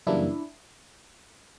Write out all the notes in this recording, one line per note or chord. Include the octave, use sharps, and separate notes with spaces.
F#2 C#3 E3 G3 A#3 D4 E4